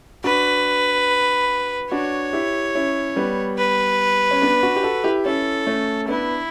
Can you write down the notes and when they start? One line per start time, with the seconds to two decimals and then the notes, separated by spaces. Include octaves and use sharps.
0.24 D4 F#4 B4
1.91 D4 F#4 C#5
2.33 E4 G4
2.75 C#4 E4
3.16 G3 B3
3.58 B4
4.31 C#4
4.42 B3 D4
4.63 D4 F#4
4.76 G4
4.83 F#4 A4
5.04 E4 G4
5.25 C#4 E4 A4
5.67 A3 C#4
6.09 B3 D4 E4